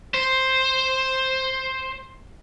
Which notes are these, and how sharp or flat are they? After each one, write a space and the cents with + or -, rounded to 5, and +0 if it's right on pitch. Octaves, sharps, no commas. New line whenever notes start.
C5 +5